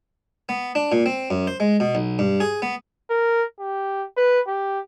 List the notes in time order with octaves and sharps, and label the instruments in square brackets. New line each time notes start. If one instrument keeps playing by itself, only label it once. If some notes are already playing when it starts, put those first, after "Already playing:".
[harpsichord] B3
D4
A#2
C4
F#2
C5
G#3
B2
B1
G2
G#4
B3
[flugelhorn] A#4
G4
B4
G4